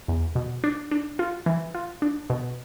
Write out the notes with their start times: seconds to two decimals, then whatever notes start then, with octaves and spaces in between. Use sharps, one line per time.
0.08 E2
0.35 B2
0.64 D4
0.91 D4
1.19 F4
1.46 E3
1.75 F4
2.02 D4
2.30 B2